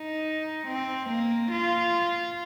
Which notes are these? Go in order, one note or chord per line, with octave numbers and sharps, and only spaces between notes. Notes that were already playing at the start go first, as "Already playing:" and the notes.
Already playing: D#4
C4
A#3
F4